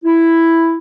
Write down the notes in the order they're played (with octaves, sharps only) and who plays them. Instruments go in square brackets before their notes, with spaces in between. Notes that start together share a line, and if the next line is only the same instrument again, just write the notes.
[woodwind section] E4